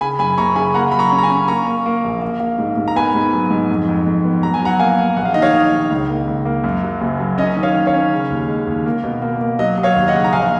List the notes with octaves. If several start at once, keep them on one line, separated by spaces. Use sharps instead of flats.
C#3 G#5 B5
F#2 G#5 B5
F#1 A#5 C#6
C#3 G#5 B5
A#3 F#5 A#5
F#3 B5
A#5 C#6
C#4
A#5
G#5 B5
C#4
A#3 A#5 C#6
A#3
A#3
A#1
A#3
A#3
G#2
G#2
A#5
B3 G#5 B5
G#2
F#3
G#2
F2
F2
F2
B3
F#3 A#5
G#5
F#3 F#5 A#5
A#3 F5 G#5
A#3
A#1 F#5
F5
D#3 D#5
C#5 F5
D#3
D#3
C#2
A#3
C#2
A#3
F#2
F#3
F#1
F#3
C#4 D#5
D#3
C#5 F5
D#3
C#5 F5
C#4
C#3
D#2
G#3
D#2
A#3
B2
A#3
A#3
F#3 D#5
F#3
C#5 F5
D#2
D#5 F#5
C#3
A#5
A#1 F5 G#5